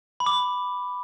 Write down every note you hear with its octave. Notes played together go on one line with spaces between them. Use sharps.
B5
D6